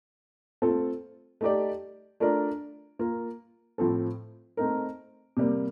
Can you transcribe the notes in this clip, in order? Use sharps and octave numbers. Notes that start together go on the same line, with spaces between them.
A3 C4 F4 A4
A3 D#4 G4 D5
A3 D4 F4 A#4 D5
A#3 F4 A#4
A2 F3 C4 F4 A4
A3 C4 D#4 A#4
C3 G3 A#3